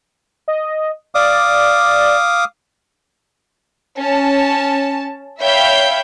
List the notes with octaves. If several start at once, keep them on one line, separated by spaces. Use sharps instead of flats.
D#5
D5 F5 D6 D#6
C#4 A5
C#5 E5 F5 G5 B5 G6